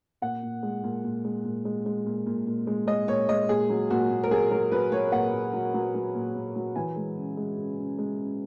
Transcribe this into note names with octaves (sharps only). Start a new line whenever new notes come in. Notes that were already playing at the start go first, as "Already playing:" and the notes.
A#2 F#5
A#2
G#3
A#2
A#2
G#3
A#2
G#3
G#3
A#2
A#2
A#2
G#3
G#3 D#5
A#2 C#5
G#3 D#5
A#2 G#4
F#3
A#2 F#4
A#2
A#4
F#3 G#4
F#3 A#4
F#3 B4
F#3 C#5
A#2 F#5
A#2
F#3
F#3
F#3
A#2
A#2
F#3
E3 G#5
G#3
C#3
G#3
C#3
C#3
G#3
C#3